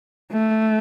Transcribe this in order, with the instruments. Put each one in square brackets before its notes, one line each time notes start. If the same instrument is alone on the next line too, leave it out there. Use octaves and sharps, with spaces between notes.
[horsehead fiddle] A3